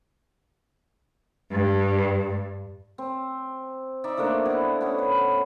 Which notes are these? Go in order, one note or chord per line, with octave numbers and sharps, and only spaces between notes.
G2
C4
D#4 D5 E5
F3 A3 A#3 D4
B3 E4
B3 C#4 A4
B4